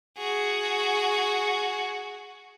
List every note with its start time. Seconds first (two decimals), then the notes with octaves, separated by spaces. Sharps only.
0.18 F#4 G#4